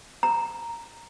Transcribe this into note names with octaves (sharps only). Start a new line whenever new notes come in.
A#5